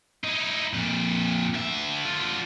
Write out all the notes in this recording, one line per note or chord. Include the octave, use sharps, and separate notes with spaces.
D#4 E4
F2 A#2
D3 E5
D3 F4